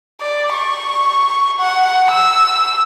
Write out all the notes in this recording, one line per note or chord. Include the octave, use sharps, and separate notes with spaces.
D5
C#6
F#5
E6